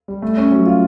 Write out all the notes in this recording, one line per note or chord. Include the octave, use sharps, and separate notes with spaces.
G3
A3
C#4
F#3
F4